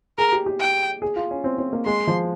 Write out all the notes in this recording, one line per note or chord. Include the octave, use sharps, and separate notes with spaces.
G#4 A#4
G4
G4
G5
G#4
F4
C#4
C4
C4
A#3
G#3 C6
F3